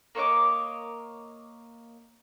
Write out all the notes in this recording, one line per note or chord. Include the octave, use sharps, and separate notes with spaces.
A#3 C#5 D#5 D6